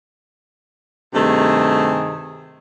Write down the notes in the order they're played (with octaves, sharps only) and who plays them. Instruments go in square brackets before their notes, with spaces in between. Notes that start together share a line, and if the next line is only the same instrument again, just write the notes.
[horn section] G2 C3 D#3 A3 G#4